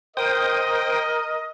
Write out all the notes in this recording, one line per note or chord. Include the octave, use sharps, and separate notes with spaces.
A#4 C5 D#5 G5 D#6